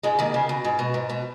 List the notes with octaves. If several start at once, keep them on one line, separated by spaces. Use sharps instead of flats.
G#2 G#3
D#2 D#3
C#3
B2
G#2
B2
G#2
B2